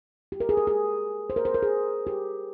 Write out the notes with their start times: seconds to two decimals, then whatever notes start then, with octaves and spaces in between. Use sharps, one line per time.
0.32 G4
0.40 A#4
0.49 G#4
0.57 A#4
0.67 G#4
1.30 C5
1.36 A#4
1.45 C5
1.54 A#4
1.63 G#4
2.07 G4